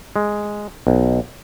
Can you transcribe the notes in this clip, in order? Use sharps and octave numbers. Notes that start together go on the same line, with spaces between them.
G#3
B1